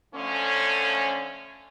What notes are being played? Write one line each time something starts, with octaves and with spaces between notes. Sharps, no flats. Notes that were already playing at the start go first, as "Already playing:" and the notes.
D3 F3 A3 C#4